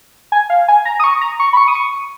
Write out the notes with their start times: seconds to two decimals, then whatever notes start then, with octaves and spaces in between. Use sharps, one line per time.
0.32 G#5
0.50 F5
0.68 G#5
0.85 A#5
1.00 D#6
1.04 C#6
1.21 A#5
1.40 C#6
1.53 B5
1.57 C#6
1.68 D#6
1.75 C#6